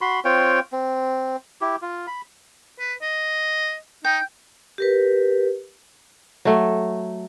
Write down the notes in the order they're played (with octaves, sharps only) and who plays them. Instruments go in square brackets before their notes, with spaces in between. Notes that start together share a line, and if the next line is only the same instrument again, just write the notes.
[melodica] F#4 B5 C6
C4 F4 C#5 G5
C4
E4 G4
F4
B5
[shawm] B4
D#5
[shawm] D#4 [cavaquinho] G5
[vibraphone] G4 A#4 B4
[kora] F#3 A3